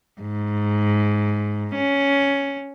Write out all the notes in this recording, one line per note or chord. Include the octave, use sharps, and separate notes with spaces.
G#2
C#4